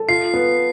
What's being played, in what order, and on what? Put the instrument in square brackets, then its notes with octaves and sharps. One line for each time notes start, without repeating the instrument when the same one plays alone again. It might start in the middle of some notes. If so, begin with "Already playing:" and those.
Already playing: [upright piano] A4
[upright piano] F4 [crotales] C7
[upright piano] B3